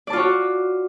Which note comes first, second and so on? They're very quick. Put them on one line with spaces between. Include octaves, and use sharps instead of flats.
D5 A5 F4 C#5 F#4